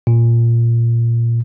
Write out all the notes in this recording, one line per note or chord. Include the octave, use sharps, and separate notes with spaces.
A#2